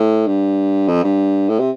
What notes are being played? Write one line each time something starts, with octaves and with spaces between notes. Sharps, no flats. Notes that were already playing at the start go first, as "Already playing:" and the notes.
Already playing: A2
G2
F2
G2
A2
C3